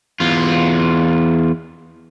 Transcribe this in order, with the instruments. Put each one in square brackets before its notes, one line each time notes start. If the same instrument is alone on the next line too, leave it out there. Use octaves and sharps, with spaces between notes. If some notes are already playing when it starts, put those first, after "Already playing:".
[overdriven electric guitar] E2 F4